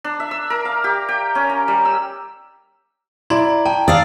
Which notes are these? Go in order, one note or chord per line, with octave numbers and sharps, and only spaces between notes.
D4
E5
E6
A#4
F5
G4
G5
C#4
A#5
G3
E6
E4 D5 A#5 C6 G#6
G5 A5
D5 F5 D#6 E6 C7